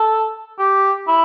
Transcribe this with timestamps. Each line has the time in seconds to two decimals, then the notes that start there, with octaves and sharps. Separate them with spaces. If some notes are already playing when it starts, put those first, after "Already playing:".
Already playing: A4
0.59 G4
1.08 E4